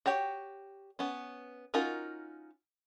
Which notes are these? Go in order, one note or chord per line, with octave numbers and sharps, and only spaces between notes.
F#4 G4 C#5 G5
B3 C#4
C#4 D#4 F4 F#4 A#4